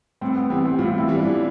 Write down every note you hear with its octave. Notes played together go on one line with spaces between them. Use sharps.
A2 C4
B3
E3 G3 C4
C4
A2 F4
E4
E3 G3
D4